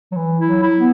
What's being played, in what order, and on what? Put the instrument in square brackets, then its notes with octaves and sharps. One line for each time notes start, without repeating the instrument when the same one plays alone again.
[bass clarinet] F#3
E3
[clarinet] E4
[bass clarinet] F#3
[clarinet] E4
[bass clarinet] B3